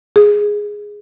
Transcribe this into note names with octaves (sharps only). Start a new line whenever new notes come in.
G#4